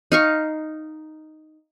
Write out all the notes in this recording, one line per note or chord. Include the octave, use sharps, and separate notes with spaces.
D#4 F5 C#6